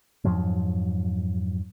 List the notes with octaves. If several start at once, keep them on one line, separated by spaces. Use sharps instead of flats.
F2 G#2 F3 F#3